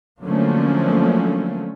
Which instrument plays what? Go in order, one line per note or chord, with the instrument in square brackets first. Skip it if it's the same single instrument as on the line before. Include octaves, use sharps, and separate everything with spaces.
[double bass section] D3 F3 F#3 A3 A#3 C#4